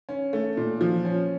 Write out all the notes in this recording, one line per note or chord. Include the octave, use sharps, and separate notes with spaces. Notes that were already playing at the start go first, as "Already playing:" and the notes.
C#4
A3
A#2
F3
C#4